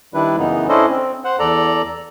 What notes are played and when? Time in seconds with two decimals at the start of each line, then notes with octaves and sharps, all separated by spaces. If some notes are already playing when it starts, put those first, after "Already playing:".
0.14 D#3 G3 D4 E4 B4
0.38 F#2 C#3 E3 B3 D#4
0.69 C#4 D4 E4 A4 C5 D#5
0.90 C4
1.24 C5 F#5
1.39 E2 A4 D5 A#5